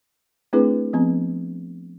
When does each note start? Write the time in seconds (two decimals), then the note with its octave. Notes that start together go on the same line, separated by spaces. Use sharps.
0.53 A3 C4 D4 E4 G#4 B4
0.93 F3 B3 C4